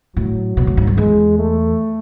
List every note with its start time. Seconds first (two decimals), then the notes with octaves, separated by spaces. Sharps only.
0.16 A2 F#3
0.57 B2
0.67 A2
0.77 G#2
0.87 F#2
0.97 E2 G#3
1.39 A3